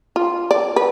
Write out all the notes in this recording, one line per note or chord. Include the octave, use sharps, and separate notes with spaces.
F4
D5
B4